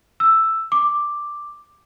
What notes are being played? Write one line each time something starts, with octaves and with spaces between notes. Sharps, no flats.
E6
D6